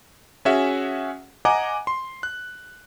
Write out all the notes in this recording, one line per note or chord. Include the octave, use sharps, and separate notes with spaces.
C#4 F#4 G#4 E5 F#5
D#5 F#5 G#5 A#5 D6
C6
F#6